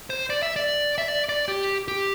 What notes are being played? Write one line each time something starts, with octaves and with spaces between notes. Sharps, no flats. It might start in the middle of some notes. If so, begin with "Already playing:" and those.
C5
D5
E5
D5
E5
D5
D5
G4
G4